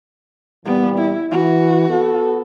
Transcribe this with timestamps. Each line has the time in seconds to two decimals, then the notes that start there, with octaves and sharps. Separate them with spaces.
0.65 A#2 E3 G3 B3
0.99 E4
1.31 E3 F#4
1.89 B3 A4